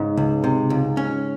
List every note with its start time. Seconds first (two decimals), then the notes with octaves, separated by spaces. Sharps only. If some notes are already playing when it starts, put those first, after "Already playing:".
Already playing: G#2 C#3
0.17 C#2
0.44 C3
0.70 C#2
0.97 C#4